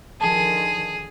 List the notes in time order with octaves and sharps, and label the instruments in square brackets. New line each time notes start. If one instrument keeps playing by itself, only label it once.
[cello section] D3 D#3 F3 [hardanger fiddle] G#4 [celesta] A5